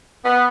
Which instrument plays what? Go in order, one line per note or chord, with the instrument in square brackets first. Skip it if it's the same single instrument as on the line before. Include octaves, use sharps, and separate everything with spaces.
[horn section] B3